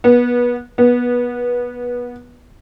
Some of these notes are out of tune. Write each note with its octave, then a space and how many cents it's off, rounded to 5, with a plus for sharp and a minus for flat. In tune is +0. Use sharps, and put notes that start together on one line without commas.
B3 -20
B3 -15